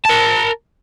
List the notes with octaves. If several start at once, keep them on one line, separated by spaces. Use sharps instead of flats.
A#4 A5